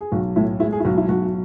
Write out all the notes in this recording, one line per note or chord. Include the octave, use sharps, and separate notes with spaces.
G#4
B1 F#4
A2 E4
G#3 E4
G#4
E4
B1 F#4
E4
B1 F#4